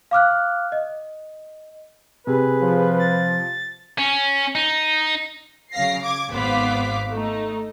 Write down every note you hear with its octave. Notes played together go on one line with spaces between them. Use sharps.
F5 D6 F6 F#6
D#5
C3 G#4 B4
F3
A6
C#4
D#4
C#3 F#3 F5 A#6 C7
D6 G#6
G#1 B3 C5 F5 D6 B6
A3 D#4